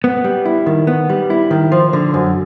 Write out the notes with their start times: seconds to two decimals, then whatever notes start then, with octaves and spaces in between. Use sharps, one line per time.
0.04 B3
0.24 G3
0.45 E4
0.66 D#3
0.87 B3
1.09 G3
1.30 E4
1.51 D#3
1.72 F3
1.93 D3
2.14 F#2